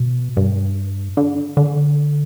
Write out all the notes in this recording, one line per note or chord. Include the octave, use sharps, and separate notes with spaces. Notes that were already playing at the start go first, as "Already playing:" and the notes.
Already playing: B2
G2
D3
D3